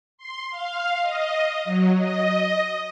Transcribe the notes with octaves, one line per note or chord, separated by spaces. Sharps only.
C6
F5
D#5
F#3
D#5